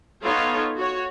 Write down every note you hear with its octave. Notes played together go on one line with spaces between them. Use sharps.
B3 D#4 F4 A4 C#5
F#4 C#5